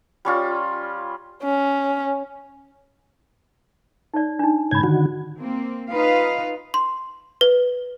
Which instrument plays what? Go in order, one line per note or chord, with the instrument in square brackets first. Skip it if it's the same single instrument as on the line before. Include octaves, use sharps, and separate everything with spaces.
[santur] G3 C#4 F4
[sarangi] C#4
[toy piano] D#4 C#5 D5
D4 D#4
[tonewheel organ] G#2 C#3 G#6 [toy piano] C#5 B5
[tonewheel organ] D3 D#3 F#4
[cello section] A#3 C4
D#4 F4 B4 F5
[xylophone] C6
B4